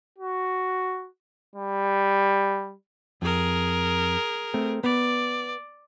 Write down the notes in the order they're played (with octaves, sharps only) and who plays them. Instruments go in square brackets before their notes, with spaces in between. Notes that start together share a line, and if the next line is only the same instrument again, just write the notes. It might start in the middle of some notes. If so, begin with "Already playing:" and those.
[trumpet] F#4
G3
[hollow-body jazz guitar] F2 [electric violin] G#4 A#4
[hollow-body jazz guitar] A3 C4
[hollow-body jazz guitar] B3 [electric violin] D5